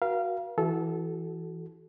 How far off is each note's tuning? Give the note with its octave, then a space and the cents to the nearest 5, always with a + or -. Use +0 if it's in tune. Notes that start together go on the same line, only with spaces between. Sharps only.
F#4 +5 A#4 +40 F5 -20
E3 +0 F#4 +20 A4 -20